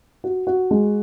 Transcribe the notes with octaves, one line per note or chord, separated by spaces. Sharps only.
F#4
F#4
G#3